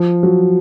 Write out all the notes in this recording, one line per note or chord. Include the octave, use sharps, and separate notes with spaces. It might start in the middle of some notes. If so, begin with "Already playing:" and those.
Already playing: F3
F#3